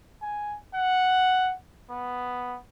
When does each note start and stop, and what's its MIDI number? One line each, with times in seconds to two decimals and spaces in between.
0.22 0.56 80
0.75 1.53 78
1.91 2.57 59